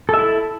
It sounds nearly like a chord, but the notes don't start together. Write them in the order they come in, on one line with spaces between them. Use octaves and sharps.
A4 E5 E4